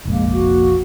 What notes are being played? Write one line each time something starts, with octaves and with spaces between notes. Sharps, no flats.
F1 A#1 G#3 A#3
F#4